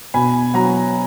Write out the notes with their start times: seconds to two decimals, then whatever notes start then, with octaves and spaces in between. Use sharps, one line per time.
0.14 B2 G#5 B5
0.54 F#3 F#5 A#5